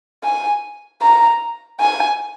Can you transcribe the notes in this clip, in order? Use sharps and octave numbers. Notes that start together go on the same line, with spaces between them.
G#5
A#5
G#5